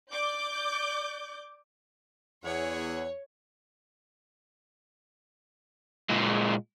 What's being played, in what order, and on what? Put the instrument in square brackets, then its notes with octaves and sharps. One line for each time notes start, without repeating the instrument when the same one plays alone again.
[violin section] D5 D6 G6
[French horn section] E2 [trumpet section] G#4 E5 F#5 [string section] C#5
[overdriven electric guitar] A#2 G#3